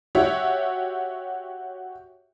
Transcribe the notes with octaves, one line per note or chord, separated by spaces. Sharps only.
F#4 G4 C#5 E5